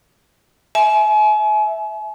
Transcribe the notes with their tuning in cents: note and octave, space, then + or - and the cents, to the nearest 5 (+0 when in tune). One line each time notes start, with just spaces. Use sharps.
E5 +0 G#5 +40